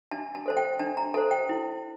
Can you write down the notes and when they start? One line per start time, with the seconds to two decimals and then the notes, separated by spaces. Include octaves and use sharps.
0.11 D4 A5
0.35 A5
0.46 A4 C5 A5
0.57 G5
0.79 D4 A5
0.97 A#5
1.14 A4 C5 A5
1.31 G5
1.49 E4